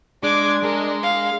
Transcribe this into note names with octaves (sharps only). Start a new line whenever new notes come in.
G#3 D4 D6 G#6
G#3 G#4 A#4
F5